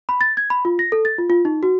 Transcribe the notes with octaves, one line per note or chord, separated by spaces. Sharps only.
B5
A6
G#6
B5
F4
A#6
A4
A6
F4
F4
D#4
F#4